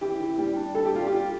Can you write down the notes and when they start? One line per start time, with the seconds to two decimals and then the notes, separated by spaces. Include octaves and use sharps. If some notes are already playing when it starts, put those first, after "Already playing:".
0.01 E3 G4
0.20 E3
0.38 G3
0.56 D4
0.75 G3 A4
0.85 G4
0.92 G3 F4
1.06 G4
1.11 F4